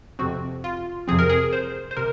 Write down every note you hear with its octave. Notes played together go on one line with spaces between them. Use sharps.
F2 C3 F3 C4 F#4
F4
F2 C3 F3 C4 G#4
A#4
G#4
C5
C5
C3 A#4